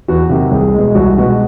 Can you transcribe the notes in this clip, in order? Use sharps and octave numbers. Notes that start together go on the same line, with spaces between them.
E2 F#4
C3 D#3 F#3 G4
C2 G#4
G#3
B2
C2 F#4
B2 G#3 F#4